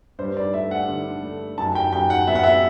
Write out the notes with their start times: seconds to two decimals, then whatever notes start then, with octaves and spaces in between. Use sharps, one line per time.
0.19 G2 C5
0.37 D5
0.53 A3 E5
0.71 F#5
0.88 D3
1.23 A3
1.58 F#2 A5
1.75 G5
1.93 F#2 G5
2.10 F#5
2.27 B3 E5
2.35 F#5
2.44 E5